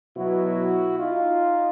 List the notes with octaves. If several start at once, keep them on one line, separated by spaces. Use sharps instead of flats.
B2 F#3 B3 E4 F#4
D#4 F4